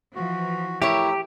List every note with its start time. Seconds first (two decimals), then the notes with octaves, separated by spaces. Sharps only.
0.15 E3 F3 F#4
0.82 A2 A3 E4 G4 A#4 C#5 E6